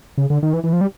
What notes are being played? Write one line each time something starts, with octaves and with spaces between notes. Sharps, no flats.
C#3
D3
D#3
E3
E3
F3
G3